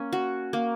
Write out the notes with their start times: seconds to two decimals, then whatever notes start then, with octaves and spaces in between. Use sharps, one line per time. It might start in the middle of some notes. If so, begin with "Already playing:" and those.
Already playing: A#3 C#4
0.13 F#4
0.53 A#3